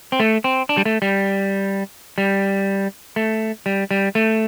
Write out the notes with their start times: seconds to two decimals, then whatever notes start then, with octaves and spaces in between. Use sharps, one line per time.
0.12 C4
0.20 A3
0.44 C4
0.69 D4
0.77 G3
0.85 A3
1.02 G3
2.18 G3
3.16 A3
3.66 G3
3.91 G3
4.15 A3